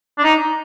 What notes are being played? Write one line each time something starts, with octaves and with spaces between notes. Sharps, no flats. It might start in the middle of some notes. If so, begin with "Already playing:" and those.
D4
D#4